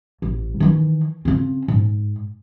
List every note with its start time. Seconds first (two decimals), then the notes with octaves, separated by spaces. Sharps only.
0.22 A1
0.60 D#3 E3
1.25 C#3 C4
1.68 G#2